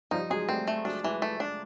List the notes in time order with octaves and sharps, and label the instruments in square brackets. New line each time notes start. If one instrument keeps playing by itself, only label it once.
[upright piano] F3 G3 [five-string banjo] D#4
[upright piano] F#3 G#3 [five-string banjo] G#4
[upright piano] G3 A3 [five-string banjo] C4
[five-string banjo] A3
[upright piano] F#3 G#3 [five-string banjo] D4
[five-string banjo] E3 [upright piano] F#3 G#3
[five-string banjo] A3
D4